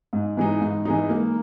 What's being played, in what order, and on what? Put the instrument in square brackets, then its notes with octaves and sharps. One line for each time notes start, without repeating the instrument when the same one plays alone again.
[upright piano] G#2
E3 G#3 D#4
G#2
E3 G#3 D#4
A#3